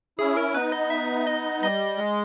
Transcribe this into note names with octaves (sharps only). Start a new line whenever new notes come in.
C#4 E4 G#4
A#4
B3 D#4 B4
D#5
E5
D#5
G3 D#5
G#3